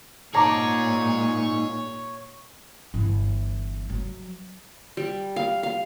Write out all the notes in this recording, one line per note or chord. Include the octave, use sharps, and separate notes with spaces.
A#2 D#4 G#4 C#5 A#5 D6
G1 E3
F#3
G3
F5
F5